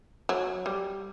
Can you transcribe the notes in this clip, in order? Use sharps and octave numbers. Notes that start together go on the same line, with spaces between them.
F#3
G3